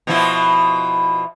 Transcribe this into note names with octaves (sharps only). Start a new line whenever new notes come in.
B2 F3 E4